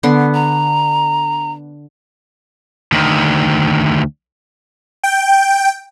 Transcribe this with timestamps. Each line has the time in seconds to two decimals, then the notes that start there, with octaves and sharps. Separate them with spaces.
0.03 D3 B3 C6
0.34 A#5
2.92 D2 D#3
5.04 G5